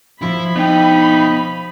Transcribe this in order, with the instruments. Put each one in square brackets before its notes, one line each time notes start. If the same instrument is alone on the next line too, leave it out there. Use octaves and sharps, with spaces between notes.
[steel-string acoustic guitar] F3 [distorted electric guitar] E4 [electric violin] B5
[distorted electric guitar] B2 G5 [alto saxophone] D#4